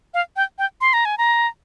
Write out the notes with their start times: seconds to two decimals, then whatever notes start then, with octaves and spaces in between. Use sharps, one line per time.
0.14 F5
0.36 G5
0.58 G5
0.81 C6
0.93 A#5
1.05 G#5
1.18 A#5